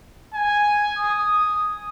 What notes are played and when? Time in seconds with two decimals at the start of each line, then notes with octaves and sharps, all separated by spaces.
0.34 G#5
0.98 D#6